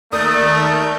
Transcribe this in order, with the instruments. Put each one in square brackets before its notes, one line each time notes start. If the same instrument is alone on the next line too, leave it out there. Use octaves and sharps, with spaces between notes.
[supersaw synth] D#2 A#4 G6 [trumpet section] A3 [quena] D5 [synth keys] D#6